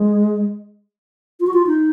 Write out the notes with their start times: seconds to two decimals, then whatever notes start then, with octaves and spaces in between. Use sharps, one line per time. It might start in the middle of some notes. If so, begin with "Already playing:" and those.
Already playing: G#3
1.40 F4
1.47 F#4
1.54 F4
1.67 D#4